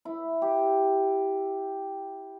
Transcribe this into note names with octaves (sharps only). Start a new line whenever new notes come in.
E4
G4